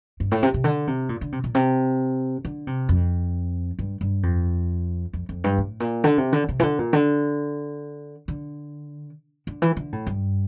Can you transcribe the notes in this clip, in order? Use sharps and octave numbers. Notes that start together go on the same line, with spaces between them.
G2
A2
C3
C3
D3
C3
A#2
D3
C3
A#2
C3
D3
C3
F2
G2
G2
F2
F2
F2
G2
A2
A#2
D3
C3
D3
C3
E3
D3
A#2
D3
D3
D3
E3
D3
A2
G2